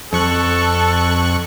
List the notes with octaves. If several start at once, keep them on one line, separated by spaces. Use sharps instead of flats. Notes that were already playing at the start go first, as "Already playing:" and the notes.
F2 A4 C#6 F#6